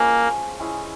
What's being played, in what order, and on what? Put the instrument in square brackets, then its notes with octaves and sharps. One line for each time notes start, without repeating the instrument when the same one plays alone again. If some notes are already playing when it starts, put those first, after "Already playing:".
Already playing: [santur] F3 G#3 C#4 [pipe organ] A#3
[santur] G#3 C#4 E4 G#4